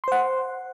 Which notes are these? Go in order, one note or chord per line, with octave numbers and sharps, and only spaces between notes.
C5 F#5 C6